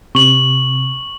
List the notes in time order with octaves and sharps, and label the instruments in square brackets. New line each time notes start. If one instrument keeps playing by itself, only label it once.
[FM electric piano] C3 [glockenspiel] C#6 F#7